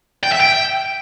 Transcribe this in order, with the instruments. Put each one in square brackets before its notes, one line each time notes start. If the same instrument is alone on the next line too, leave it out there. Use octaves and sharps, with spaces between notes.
[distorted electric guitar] G5
E5
G5